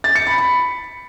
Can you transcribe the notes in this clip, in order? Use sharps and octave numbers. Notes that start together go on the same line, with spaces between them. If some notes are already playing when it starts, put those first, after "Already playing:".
A6
C#7
B5
B5